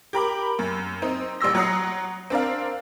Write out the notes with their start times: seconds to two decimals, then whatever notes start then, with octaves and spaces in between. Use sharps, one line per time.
0.13 G4 A#4 B5 D6
0.59 F#2
1.02 C4 D#4
1.41 A1 G3 C6 E6 A#6
1.55 F#3 F#5 A#5 D#6 C7
2.30 C4 D4 A#4 F5